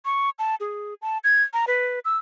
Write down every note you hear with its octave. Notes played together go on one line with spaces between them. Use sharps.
C#6
A5
G#4
A5
G#6
A#5
B4
E6